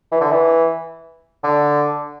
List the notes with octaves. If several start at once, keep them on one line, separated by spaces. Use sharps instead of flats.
E3
D3
E3
D3